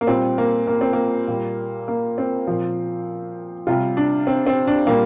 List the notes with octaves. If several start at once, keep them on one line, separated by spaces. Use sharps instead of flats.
A#3
A#2 G3 C4
A#3
A#3
C4
A#3
A#2 G3
A#3
C4
A#2 F3
C3 G3 F4
D4
C4
C4
D4
A#2 G3 A#3